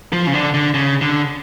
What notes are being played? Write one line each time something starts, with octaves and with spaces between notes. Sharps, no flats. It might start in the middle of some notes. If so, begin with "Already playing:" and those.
F3
C#3
D3
D3
C#3
D3